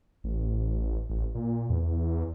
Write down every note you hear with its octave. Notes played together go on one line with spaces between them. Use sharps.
A1
A1
A#2
E2